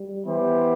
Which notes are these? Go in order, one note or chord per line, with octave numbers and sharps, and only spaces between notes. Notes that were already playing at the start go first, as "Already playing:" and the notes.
Already playing: G3
E3 B3 E4 G4 C5